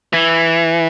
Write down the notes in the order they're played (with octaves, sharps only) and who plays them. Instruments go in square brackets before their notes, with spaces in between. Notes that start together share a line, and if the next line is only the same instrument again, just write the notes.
[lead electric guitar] E3